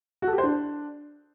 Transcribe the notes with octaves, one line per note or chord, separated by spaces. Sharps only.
F#4
A4
G4
C5
D4